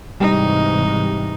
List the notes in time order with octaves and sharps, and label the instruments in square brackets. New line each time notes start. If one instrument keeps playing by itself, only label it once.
[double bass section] G#2 C3 E3 [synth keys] G3 [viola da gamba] D#4